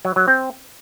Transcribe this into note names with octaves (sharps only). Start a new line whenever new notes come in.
F#3
F#3
C4